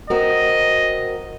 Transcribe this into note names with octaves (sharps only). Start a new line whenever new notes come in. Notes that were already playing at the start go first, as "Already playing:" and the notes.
C4 F#4 A#4 D#5